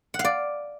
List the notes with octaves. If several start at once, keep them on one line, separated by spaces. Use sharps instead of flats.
F#5
F5
D5